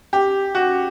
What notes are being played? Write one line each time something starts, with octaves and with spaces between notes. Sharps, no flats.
G4
F#4